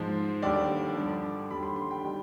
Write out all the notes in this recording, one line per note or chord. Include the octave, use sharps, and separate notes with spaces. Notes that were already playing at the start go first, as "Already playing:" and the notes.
Already playing: G#2 F3 C5
D#2 D3 G3 D5
G2 D3 F3
D#2 D3 G3 B5
C6
C6
G5
D#3 G3